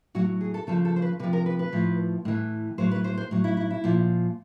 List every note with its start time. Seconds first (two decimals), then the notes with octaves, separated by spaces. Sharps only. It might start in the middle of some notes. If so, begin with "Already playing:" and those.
0.15 A2 F#3 F#4
0.41 G#4
0.54 A4
0.67 C#3 F3 A4
0.85 A4
0.96 C5
1.02 B4
1.19 C3 B4
1.24 F3
1.33 A#4
1.46 B4
1.59 B4
1.73 A2 F3
2.25 A2 E3
2.78 A2 F#3 C5
2.91 B4
3.04 C5
3.17 C5
3.31 A2 F#3
3.44 E4
3.57 E4
3.71 E4
3.84 A#2 F3